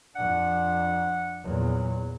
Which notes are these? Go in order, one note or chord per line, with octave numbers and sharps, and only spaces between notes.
F2 D4 F#5
E2 A#2 F#3